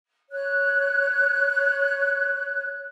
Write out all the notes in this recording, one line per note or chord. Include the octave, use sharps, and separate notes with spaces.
C#5 F#6